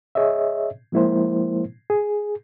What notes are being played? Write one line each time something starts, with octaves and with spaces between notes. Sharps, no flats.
G#4 C#5 D#5 E5
F3 G#3 A#3 E4 A#4 C5
G#4